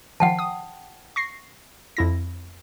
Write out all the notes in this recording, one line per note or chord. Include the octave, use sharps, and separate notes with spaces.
D#3 F3 F#5 G5 A5
D#6
C#6 A#6 C7
F2 E4 A#6